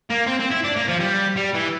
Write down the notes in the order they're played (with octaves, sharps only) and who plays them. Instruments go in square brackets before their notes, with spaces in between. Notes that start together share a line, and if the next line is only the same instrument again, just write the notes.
[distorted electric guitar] A#3
C4
C4
E4
D4
A#3
F3
G3
G3
E3